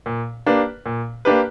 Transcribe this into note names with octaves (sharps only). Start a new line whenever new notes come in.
A#2
A#3 D4 G4 B4
A#2
A#3 D4 G4 B4